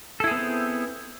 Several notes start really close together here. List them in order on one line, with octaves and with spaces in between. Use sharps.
A4 E4 G#4 B3 C4